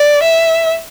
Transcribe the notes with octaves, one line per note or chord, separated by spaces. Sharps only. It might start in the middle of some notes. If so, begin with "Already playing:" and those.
Already playing: D5
E5